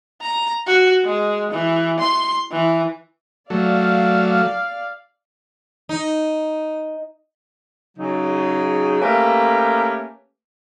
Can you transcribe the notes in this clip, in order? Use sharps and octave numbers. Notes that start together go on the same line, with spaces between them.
A#5
F#4
G#3
E3
C6
E3
F#3 A3 D5 F5
D#4
C#3 F#3 D#4
A3 A#3 C#4 G4 A4 B4